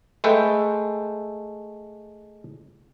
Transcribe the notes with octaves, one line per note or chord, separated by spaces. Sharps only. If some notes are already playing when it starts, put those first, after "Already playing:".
G#3 A3 A4 B4 E5 G5